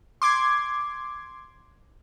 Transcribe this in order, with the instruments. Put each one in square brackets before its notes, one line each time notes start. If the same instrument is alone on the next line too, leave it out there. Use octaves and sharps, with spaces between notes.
[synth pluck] C6 D6 G#6